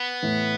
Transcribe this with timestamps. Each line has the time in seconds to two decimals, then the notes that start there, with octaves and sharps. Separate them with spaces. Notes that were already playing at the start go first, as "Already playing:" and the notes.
Already playing: B3
0.22 A2 E3 A3